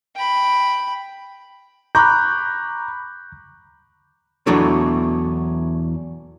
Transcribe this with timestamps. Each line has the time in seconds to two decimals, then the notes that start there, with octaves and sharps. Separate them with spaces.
0.16 G5 B5
1.95 A#5 B5 C#6 D6 F#6 G6
4.47 E2 B2 E3 F#3 A3 D4